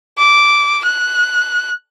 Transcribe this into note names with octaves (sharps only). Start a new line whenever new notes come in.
D6
F#6